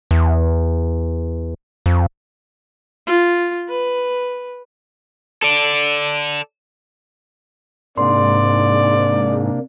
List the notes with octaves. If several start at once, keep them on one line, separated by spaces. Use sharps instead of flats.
E2
F2
F4
B4
A4 D5
G#2 C3 A#3 D4 D5 C6